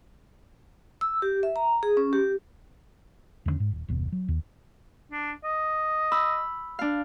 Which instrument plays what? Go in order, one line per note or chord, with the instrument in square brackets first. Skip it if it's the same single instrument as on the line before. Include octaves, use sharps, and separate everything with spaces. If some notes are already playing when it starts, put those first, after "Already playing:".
[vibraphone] E6
G4
E5
A#5
G#4
C#4
G4
[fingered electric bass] E2 G2 D3 C#4
G#2
D#1
F#1 D#2 B2
F#3
D#2
[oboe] D4
D#5
[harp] B5 E6
D4 F5